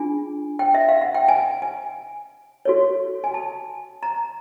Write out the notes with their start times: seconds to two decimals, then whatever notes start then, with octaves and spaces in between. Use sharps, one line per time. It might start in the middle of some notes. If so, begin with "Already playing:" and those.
Already playing: D4 F4 G#4 G#5
0.59 G5
0.74 E5
0.89 F5
1.01 F#5
1.14 G5
1.28 G#5
1.62 G#5
2.65 F#4 A4 C#5
3.24 G#5
3.34 A5
4.03 A#5